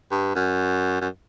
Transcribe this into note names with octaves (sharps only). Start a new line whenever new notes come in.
G2
F#2
F#2